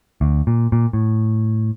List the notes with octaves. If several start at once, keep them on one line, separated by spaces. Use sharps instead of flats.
D2
A#2
A#2
A2